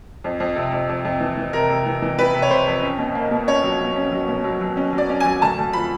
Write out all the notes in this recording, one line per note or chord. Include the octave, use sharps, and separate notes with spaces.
F2
F2
C3
F2
F2
F2
E3
E3
C3 A#4
C3
E3
E3
E3 B4
C3
C#5
C3 C5
F2
C#4
B2
A#3
B2
C#4 C#5
F#3
B2
C#4
F#3
B2
F#3
F#3
C#4
F#3
D5
C#4
G#5
F#3
D2 A5
D2
F3 B5